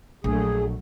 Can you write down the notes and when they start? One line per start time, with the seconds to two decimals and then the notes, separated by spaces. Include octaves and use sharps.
0.24 A#1 F#3 A3 G#4